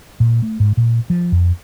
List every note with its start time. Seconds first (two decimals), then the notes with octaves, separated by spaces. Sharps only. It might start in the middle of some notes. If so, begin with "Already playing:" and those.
0.20 A#2
0.42 A3
0.60 G#2
0.77 A#2
1.10 F3
1.32 F2